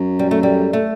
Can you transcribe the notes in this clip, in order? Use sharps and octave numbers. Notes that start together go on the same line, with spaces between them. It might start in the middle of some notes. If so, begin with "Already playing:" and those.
Already playing: F#2
G3
A3
G3
A3